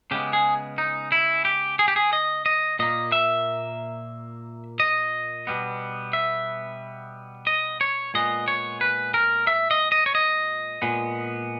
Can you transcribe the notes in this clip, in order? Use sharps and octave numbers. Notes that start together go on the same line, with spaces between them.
C#3 G#3 B3 G4
G#4
D#4
E4
G4
G#4
G4
G#4
D#5
D#5
A#2 A#3 D#5
E5
D#5
B2 G3 B3
E5
D#5
C#5
A#2 G#3 B3 D#5
C#5
B4
A#4
E5
D#5
D#5
C#5
D#5
A#2 G#3 B3